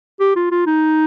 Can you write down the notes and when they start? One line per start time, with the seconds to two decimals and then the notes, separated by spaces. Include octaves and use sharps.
0.20 G4
0.36 F4
0.51 F4
0.67 D#4